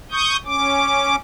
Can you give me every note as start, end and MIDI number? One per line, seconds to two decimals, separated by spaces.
0.11 0.37 85
0.11 0.37 87
0.11 0.37 91
0.46 1.16 61
0.46 1.16 86